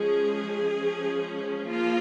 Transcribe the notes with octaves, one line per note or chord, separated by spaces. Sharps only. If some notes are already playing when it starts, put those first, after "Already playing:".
Already playing: F3 G#3 C#4 G#4
F3 G#3 C#4
F3 A#3 F4